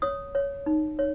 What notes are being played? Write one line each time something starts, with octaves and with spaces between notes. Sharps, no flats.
C#5 D#6
C#5
D#4
C#5